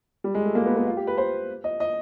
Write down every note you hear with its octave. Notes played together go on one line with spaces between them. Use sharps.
G3
G#3
A3
A#3
B3
B3
F4
G4
B4
C5
D#5
D#5